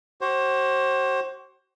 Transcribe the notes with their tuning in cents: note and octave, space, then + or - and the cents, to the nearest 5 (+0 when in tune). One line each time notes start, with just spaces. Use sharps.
F#4 +45 C5 +35